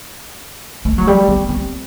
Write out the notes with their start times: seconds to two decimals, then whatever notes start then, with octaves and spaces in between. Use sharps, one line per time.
0.85 A3
0.98 F#3
1.07 G3
1.28 B3
1.49 C4